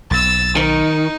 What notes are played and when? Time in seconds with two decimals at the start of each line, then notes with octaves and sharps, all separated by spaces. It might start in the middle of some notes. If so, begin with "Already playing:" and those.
0.11 B1 E6 A6
0.56 D#3 D#4